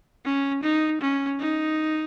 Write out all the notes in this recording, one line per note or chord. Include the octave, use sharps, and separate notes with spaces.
C#4
D#4
C#4
D#4